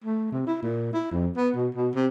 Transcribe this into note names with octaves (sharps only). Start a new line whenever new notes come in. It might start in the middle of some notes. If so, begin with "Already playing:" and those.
A3
C3
E4
A#2
E4
F2
B3
B2
B2
C3